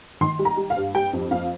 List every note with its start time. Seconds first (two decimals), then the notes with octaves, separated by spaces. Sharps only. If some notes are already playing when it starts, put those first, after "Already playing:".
0.21 D#3 C6
0.39 G3
0.45 A#5
0.57 G3
0.70 F5
0.77 G2
0.95 G3 G5
1.13 F2
1.31 F2 F5